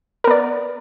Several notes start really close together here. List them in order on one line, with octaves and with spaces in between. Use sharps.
A#4 B3 D5